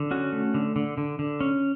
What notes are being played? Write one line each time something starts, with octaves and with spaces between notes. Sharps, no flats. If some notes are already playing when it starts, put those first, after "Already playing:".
Already playing: D3
C#4 F#4
A3
D3
D3
D3
D3
C#4